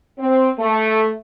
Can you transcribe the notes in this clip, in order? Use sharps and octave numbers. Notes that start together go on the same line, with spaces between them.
C4
A3